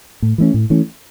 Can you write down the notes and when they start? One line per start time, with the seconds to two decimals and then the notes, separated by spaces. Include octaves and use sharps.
0.22 A2
0.38 E3 A3 C#4
0.54 A2
0.70 E3 A3 C#4